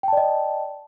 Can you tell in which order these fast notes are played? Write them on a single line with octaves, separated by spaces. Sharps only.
G5 A5 D5 D#5